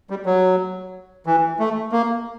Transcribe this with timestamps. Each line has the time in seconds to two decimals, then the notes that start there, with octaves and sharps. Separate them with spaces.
0.10 G3
0.26 F#3
1.26 E3
1.59 A3
1.92 A#3